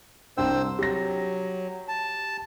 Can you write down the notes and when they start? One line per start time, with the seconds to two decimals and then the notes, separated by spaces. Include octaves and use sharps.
0.38 C2 D4 C5 G5 E6
0.79 F#3 G4 A#6
1.88 A5